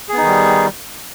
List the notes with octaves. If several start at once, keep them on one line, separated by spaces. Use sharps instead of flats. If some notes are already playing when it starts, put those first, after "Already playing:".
D#3 G3 B3 D#4 G#4